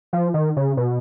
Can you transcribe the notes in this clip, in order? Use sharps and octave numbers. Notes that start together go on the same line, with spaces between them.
F3
D#3
C#3
B2